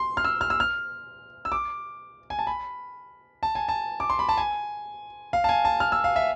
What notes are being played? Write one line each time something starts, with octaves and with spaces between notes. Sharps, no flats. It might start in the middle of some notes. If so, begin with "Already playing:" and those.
Already playing: C6
F6
E6
F6
E6
F6
E6
D6
G#5
A5
B5
A5
G#5
A5
D6
C6
B5
A5
G#5
F5
A5
G#5
A5
F6
E6
F5
E5